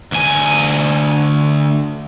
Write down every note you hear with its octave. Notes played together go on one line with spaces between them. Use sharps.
D2 G#5